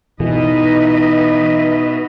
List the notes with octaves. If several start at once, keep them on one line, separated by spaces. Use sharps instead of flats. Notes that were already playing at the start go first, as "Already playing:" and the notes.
B2 E3 D#4 B4 D#5 E5